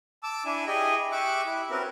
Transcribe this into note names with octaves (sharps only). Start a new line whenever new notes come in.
A5 D6 E6
D4 E4 G#5
E4 G4 G#4 D#5 G#5
G4 E5 C#6 D6 F#6
E4
C4 C#4 F#4 A#4 B4